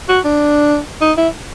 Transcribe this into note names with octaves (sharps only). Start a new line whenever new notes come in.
F#4
D4
D#4
E4